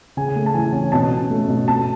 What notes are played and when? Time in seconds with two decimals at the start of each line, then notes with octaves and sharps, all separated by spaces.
0.17 C#3 G#5
0.36 A3
0.46 A5
0.54 E3 G#5
0.73 C#4 G#5
0.92 B2 A5
1.11 C#4
1.30 A3
1.48 B2
1.68 B2 A5